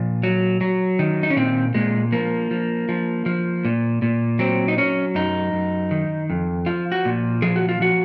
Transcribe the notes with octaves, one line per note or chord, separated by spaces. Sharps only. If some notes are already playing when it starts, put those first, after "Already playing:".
Already playing: A#2 F3
F#3
F#3
D#3
D#4
C#4
A#2 C4
A#2 G#3
F3 A#3
F3
F3
F3
A#2
A#2
F#3 C4
D#4
F#3 C#4
F#2 D#4
F#2
D#3
F2
F3 F4
F#4
A#2
F3 G#4
F#4
F4
F3 F#4